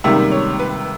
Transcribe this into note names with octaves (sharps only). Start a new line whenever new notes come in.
C#2 C3 D#3 G3 A#3 E5
C#5
B4